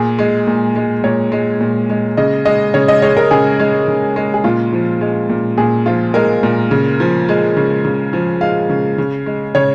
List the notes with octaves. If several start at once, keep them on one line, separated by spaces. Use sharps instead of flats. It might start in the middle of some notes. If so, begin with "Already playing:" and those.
Already playing: A#2 G#4
G#3
A#2
G#3
A#2 C#5
G#3
A#2
G#3
C#3 D#5
G#3 D#5
C#3 C#5
D#5
G#3 C#5
A#4
C#3 G#4
G#3
C#3
G#3
G#4
A#2 F4
F3
G#3
A#2
A#2 G#4
F3 F4
G#3 A#4
A#2
C#3
F3
G#3
C#3
C#3
F3
G#3 F5
C#3
C#3
G#3
C#3 C#5